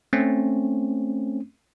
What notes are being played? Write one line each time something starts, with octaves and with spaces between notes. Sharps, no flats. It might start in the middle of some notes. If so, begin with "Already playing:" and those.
A3 C4 C#4